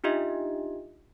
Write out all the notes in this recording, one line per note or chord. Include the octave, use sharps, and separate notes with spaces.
D4 D#4 F4 G4 D#5 E5